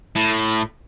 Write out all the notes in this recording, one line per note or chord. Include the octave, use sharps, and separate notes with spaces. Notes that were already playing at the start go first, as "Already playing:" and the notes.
A2